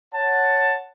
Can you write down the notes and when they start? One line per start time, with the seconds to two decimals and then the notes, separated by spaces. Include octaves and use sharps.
0.13 C#5 F#5 A5